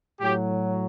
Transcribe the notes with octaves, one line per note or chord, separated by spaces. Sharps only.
A2 F#3 G4